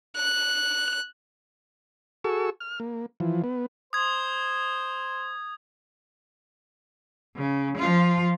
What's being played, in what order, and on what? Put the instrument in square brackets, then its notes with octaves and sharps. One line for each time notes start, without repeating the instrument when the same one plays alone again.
[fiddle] F#6
[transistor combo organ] F#4 G#4 A4 C#6 E6
F6
A#3
E3 F3
B3
[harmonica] C5 [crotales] D#6 G#6
[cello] C#3
F3 F4